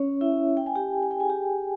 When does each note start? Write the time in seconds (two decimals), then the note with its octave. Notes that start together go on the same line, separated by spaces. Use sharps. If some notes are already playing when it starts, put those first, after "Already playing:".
Already playing: C#4 C#5
0.21 E4 E5
0.57 G5
0.66 G#5
0.76 G4 G5
1.03 G#5
1.11 G5
1.20 G#4 G#5
1.29 G4 G5